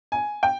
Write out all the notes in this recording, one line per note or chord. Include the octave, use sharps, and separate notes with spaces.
G#5
G5